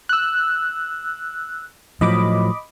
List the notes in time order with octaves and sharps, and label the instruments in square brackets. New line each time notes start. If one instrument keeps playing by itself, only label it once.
[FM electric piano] E6 F#6
[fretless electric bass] A2 F3 F#3 [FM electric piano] D#5 B5 D6